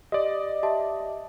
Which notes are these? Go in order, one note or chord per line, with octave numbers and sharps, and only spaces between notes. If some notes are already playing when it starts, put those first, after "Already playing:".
G4 D5 D#5
G4 E5 A5